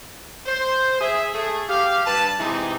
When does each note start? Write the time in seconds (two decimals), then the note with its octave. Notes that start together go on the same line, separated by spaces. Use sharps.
0.47 C5
1.00 G#4 E5
1.33 A3 G#4
1.69 G4 F5
2.06 G2 B4 A5
2.39 C3 E3 G#3 D#4 G#4